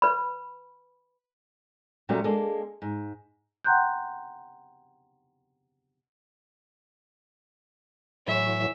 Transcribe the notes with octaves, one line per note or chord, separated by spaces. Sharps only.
B4 B5
A#2 F#3 G3 A3 C#4 F#4
G#3 A#3 D4 G#4 A4
G#2
F#5 G5 A#5 C6 F#6 G6
A2 E3 F#3 C#5 E5